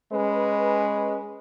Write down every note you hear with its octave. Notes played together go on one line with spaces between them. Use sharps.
G#3 C#4 B4